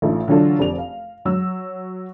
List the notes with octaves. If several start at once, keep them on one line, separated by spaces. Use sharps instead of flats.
A1 A3 D#4 F4
D3 E3 F#3 F4 A4 D5
F1 C4 G4 D5 F7
F5
F#3 E6